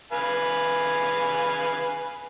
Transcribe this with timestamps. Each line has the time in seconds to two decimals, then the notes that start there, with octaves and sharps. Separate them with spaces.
0.13 B4 F5 G#5